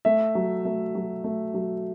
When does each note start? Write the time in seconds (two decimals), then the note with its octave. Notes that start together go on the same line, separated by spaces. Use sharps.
0.05 A3 E5
0.35 F#3
0.65 A3
0.95 F#3
1.24 A3
1.54 F#3